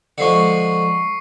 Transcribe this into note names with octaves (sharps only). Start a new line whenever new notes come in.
D3 F3 G#3 C#6 C7 C#7